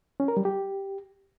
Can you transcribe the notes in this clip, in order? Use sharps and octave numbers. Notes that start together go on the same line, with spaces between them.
C#4
A#4
G3
G4